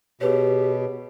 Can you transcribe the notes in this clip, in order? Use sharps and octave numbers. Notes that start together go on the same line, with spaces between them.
B2 G4 G#4 B4 C#5